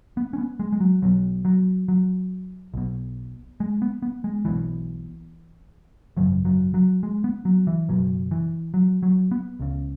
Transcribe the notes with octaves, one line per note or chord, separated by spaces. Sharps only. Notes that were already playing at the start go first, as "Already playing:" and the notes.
B3
C#4
B3
G#3
G#3
F#3
B1 B2 F#3
F#3
F#3
B1 B2
G#3
B3
B3
G#3
B1 B2 E3
G#1 F#2 C#3 F#3
F#3
F#3
G#3
B3
F#3
E3
F#1 E2 B2 F#3
E3
F#3
F#3
B3
C#2 C#3